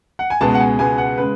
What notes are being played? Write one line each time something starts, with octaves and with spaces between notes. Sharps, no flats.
F#5
G#5
C#2 B2 G#3 B3 A5
F#5
G#5
C#2 B2 G#3 B3 G#5
F#5
C#3 G#3 B4